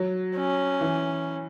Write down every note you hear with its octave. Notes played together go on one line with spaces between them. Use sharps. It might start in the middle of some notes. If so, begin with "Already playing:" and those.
Already playing: F#3
C#4
E3